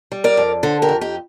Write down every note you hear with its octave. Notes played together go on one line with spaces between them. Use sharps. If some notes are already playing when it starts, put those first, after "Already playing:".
G3
A#4 D5
F2
D3 A4 C5
G4 A#4
F2
D#4 G4